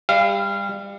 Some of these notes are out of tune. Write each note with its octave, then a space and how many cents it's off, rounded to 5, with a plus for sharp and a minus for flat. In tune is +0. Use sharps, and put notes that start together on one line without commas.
G3 +30 F5 -20